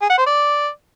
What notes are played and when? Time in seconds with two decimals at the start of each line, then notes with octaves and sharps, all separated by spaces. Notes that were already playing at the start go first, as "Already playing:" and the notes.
0.02 G#4
0.10 F#5
0.18 C5
0.26 D5